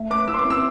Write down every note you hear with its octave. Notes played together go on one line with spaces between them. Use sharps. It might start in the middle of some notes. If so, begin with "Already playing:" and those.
Already playing: A3
B4 D6
E4 E6
C6
D6
C4
E6